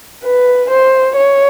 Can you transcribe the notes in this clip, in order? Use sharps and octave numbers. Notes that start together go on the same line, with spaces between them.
B4
C5
C#5